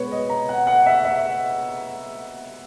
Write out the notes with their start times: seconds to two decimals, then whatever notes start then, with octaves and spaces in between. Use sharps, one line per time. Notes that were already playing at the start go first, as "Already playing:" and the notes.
Already playing: B2 G#3 B3 B4 C#5
0.11 D#5
0.29 A#5
0.49 F#5
0.67 F#5
0.86 E5
1.05 E5